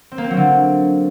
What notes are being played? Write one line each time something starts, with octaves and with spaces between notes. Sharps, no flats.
C4
A#3
C4
F#3
D3